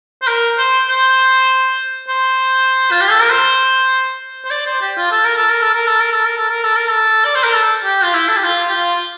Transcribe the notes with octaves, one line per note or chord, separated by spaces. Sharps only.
C5
A#4
C5
C5
C5
F4
G4
A4
A#4
C5
C5
D5
C5
G4
F4
A4
A#4
A4
A#4
A4
A#4
A4
A#4
A4
A#4
A4
A#4
A4
A#4
A4
D5
C5
A#4
A4
G4
F4
E4
A4
G4
F4
G4
F4